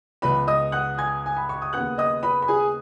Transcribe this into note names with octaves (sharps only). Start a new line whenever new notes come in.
C#2 C#3 B3 B4 B5
D#5 D#6
F#5 F#6
G#5 G#6
G#5
B5
C#6
D#6
D#2 C#3 B3 F#5 F#6
D#5 D#6
B4 B5
B5
G#4 G#5